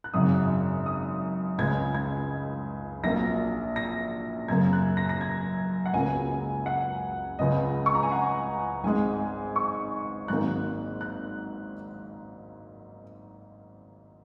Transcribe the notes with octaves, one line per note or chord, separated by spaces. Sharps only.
F#6
G#1 F#2 C#3 F#3 D#6
D#6
C#2 C#3 G#3 G#6
G#6
A#1 A#2 F#3 A#3 A#6
A#6
F#2 C#3 A#3 G#6
F#6
A#6
A#6
G#6
F#5
C#2 C#3 F#3 A#3 G#5
F#5
C#2 C#3 G#3 D#5
C#6
A#5
G#5
F#5
G#1 G#2 G#3 G#5
C#6
G#1 G#2 D#3 F#3 A#3 F#6
F#6